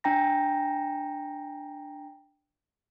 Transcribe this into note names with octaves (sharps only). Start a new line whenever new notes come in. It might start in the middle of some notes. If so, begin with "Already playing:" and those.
D4 G5 A#5 A#6